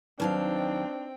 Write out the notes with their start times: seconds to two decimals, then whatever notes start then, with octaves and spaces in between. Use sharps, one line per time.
0.20 D#2 F#3 C4 D4 D#4 B4 F5 G5
0.55 D#5